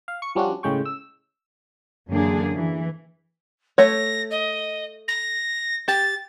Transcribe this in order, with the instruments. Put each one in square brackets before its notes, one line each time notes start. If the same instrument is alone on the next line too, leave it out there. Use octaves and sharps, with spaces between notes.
[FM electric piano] F5
C#6 C#7
F3 G3 C#4 D4 F4 F#4
A2 C#3 G#3 G5 C#6
E6
[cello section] F#2 D3 E3 A#3 D4 G#4
E3
[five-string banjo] A3 C#5 [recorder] A#6
[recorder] D#5
A#6
[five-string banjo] G4 [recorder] A6